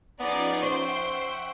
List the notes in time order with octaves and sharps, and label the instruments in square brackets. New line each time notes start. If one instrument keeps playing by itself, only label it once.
[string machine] F3 C#4 [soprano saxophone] B3 [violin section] D#4 G#4 D5
[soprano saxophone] C5 [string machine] E5 F#5 G5 [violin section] C6 [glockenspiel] C#6 D7